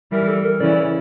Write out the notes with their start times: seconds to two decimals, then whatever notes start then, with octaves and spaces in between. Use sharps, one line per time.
0.11 E3 G3 A#4
0.28 A4
0.45 A#4
0.60 C#3 E3 D5